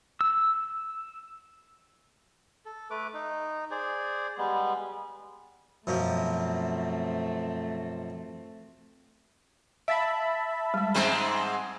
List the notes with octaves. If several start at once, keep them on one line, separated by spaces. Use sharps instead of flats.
E6
A4
A3 B4 D6
D#4
G#4 C5 D5
G3 G#3 B3
F#2 B2 F3 A3 C4
E5 F5 A5 B5
G3 G#3
G#2 G#3 C4 A#5